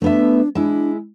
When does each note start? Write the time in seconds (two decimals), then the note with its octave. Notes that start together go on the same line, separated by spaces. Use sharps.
0.02 A3 B3 D4 E5
0.55 G#3 D4 E4